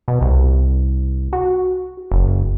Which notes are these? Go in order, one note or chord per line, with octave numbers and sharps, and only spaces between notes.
B2
C2
F#4
F#1